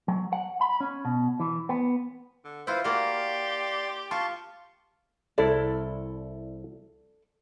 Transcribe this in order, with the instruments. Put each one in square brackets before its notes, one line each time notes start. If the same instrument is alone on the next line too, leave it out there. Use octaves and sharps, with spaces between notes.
[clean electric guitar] F#3
F#5
B5
C#4
B2
E3
B3
[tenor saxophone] D3
[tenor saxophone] E3 [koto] E4 F4 [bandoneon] B4 C5
[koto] A#3 F#4 [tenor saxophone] G4 [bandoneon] D5 C6
[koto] F4 [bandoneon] A5 C6 C#6
[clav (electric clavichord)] C2 E4 A5 [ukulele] A4 D5